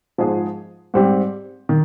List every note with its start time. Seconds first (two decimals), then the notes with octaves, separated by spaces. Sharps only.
0.18 G#2 F3 G#3 D#4 G#4
0.94 G#2 G3 C4 G4
1.69 D#3